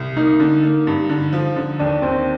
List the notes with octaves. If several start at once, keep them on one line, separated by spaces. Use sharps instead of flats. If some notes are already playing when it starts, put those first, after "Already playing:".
Already playing: C2
A#3 D#4
D3
A#3
G2
D3
F3
D3
D#2 D4
D#2 C4